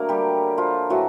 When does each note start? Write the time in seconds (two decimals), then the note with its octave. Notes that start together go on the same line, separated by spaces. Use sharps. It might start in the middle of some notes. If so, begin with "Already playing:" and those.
Already playing: D3 F#3 A3 A#3 A#4
0.09 G3 G4
0.57 F3 F4
0.89 A2 E3 F#3 A3 F#4